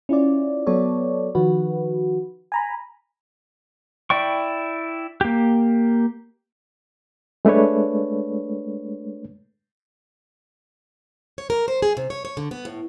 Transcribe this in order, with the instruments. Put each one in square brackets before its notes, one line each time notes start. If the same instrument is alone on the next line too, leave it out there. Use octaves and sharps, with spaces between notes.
[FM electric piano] C#4 E4 F4 D5
F#3 B3 A4 C#5 D5
D#3 F3 F#4 B4
G#5 A#5 B5
[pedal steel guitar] E4 D5 G5 C#6
A#3 G4
[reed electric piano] G#3 A3 D4 B4 C#5
[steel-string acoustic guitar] C#5
A#4
C5
G#4
C3
C#5
C#5
D3
B3
A2